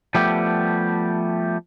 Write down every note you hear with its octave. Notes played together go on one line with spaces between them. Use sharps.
F3 G3 A3 B3 G4